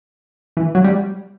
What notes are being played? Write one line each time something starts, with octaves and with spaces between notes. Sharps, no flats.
E3
F#3
G3